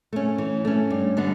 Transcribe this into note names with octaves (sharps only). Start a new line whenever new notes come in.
A3 C#4
E3
A3 C#4
G2
D3 G3 B3 D4